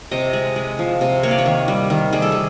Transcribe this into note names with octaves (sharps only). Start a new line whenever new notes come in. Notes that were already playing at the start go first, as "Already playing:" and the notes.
C3 D#5
G#3
G#3
F3
C3
A#3 C#5
D5
C#5
D#3
G3
D#3
G3 G#4
A4
G#4